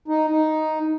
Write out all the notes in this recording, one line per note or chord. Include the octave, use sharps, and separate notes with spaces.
D#4
D#4